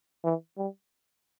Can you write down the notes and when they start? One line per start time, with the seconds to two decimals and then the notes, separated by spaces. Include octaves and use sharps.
0.24 E3
0.58 G3